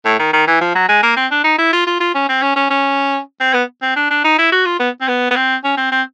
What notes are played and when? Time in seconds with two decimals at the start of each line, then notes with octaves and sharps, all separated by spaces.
0.05 A2
0.19 D#3
0.33 D#3
0.48 E3
0.61 F3
0.75 F#3
0.89 G#3
1.03 A#3
1.17 C4
1.31 D4
1.44 D#4
1.59 E4
1.73 F4
1.87 F4
2.01 F4
2.15 C#4
2.29 C4
2.43 C#4
2.56 C#4
2.70 C#4
3.41 C4
3.54 B3
3.82 C4
3.96 D4
4.11 D4
4.24 D#4
4.39 E4
4.52 F#4
4.65 F4
4.80 B3
5.01 C4
5.08 B3
5.31 B3
5.36 C4
5.64 C#4
5.77 C4
5.92 C4